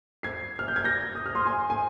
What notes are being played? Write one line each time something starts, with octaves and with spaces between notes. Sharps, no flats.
G#6 C7
F6
G6
G#6
G6 A#6
D#6
F6
C6 D#6
G#5 C6
G#5